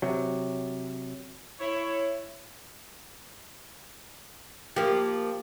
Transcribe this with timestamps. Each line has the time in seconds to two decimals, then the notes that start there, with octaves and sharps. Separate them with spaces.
0.02 C3 F#3
1.60 E4 C#5
4.76 F3 A#3 G4